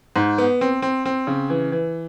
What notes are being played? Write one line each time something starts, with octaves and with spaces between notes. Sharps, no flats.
G#2
B3
C4
C4
C4
C#3
E3
E3